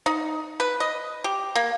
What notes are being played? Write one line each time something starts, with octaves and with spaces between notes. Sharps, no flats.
D#4
B4
D#5
G4
A#3